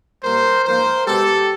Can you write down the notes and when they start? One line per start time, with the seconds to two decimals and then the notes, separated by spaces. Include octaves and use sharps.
0.23 A#2 G3 A#3 A#4 C5
0.65 G#2 F3 A#3 A#4 C5
1.06 B2 G#3 B3 G4 A4